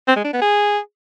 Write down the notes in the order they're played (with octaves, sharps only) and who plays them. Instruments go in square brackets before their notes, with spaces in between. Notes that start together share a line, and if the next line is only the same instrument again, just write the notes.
[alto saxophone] C4
G#3
D4
B3
G#4